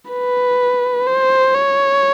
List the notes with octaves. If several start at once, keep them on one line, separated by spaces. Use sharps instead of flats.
B4
C5
C#5